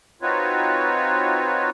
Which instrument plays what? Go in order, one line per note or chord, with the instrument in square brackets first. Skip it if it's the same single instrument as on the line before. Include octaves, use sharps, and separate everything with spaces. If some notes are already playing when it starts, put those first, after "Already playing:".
[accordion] C4 D#4 F4 F#4 B4 C#5